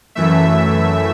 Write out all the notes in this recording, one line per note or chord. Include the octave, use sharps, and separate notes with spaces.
F#2 E3 A3 E5